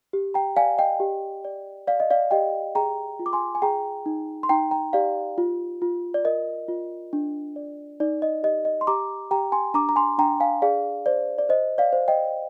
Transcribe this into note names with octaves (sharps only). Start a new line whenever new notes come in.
G4
G5 A#5
D5 F5 G#5
D#5 G5
G4
D5
D5 F5
D#5
D5 F5
G4 D#5 G5
G#4 G5 A#5
F4
D6
G#5 C6
G#5
G#4 G5 A#5
D#4
C6
D#4 G5 A#5
G5 A#5
G4 D5 F5
F4
F4
D5
A#4 D#5
F4
D4
D5
D#4 D5
D#5
G4 D#5
D#5
C6
G4 A#5 D6
G4 G5 A#5
G#5 C6
D4 A#5 D6
A#5
G#5 C6
D4 G5 A#5
F5 G#5
G#4 D5 F5
C5 D5
D5
C5 D#5
D5 F5
C5
D#5 G5